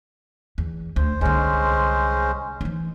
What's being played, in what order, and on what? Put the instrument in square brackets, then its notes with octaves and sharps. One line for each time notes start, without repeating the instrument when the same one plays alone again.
[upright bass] E2
[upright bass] D2 [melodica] C5
[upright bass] C2 D3 [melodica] G#3 C#4 C5
[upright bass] E3 D#4